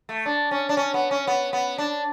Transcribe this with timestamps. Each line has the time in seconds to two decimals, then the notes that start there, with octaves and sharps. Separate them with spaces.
0.09 A3
0.26 D4
0.51 C#4
0.69 D4
0.77 C#4
0.94 B3
1.11 C#4
1.27 B3
1.53 B3
1.78 D4